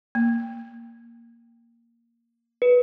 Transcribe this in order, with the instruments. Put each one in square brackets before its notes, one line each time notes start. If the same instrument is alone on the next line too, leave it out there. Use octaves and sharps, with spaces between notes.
[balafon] A#3
[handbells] B4